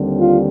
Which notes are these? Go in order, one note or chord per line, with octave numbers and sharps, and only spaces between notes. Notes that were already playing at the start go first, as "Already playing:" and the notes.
Already playing: D#2 D3 G3 C4
F4